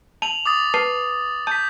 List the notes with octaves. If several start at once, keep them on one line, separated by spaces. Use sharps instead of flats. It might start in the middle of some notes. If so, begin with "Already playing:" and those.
A5 F7 F#7
D6 D#6 A6
B4 A5 C7
A5 G6 B6